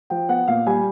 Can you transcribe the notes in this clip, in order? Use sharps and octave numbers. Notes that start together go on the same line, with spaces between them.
F3 G5
B3 F#5
A#2 F5
G3 G#5